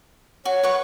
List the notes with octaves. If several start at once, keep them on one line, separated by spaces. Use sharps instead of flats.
F#4 C#5
B4 F#5 C#6